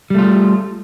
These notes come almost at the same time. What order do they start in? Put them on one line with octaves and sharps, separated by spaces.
G3 A3 F4